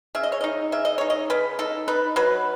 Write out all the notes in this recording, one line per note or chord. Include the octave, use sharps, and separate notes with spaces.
C#3 E5
D#5
C#5
D#4 D#5
C#3 E5
D#5
D#4 C#5
D#5
C#3 B4
D#4 A4
D#4 B4
F#3 B4